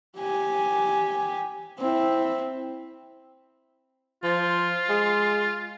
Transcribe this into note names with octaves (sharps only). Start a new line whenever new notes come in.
G4 G#5
C4 E4
F3 F4
G#3